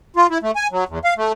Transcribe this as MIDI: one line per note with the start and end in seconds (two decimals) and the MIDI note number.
0.16 0.27 65
0.30 0.38 64
0.43 0.51 57
0.56 0.67 80
0.72 0.84 54
0.89 0.99 40
1.04 1.14 77
1.17 1.32 57